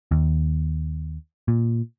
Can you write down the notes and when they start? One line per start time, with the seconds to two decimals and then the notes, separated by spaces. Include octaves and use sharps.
0.11 D#2
1.48 A#2